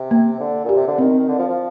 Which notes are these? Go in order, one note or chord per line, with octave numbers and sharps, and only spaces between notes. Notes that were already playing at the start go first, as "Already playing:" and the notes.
Already playing: C3
A#3
D3
A#2 G4
C3
D3
D#3 C4
D#3
D3
F3
F3